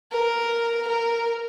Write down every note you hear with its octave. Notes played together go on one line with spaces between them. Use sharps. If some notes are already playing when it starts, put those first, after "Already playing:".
A#4
A#4